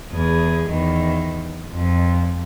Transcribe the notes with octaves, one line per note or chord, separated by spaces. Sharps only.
E2 G#4
E2 D#3
F2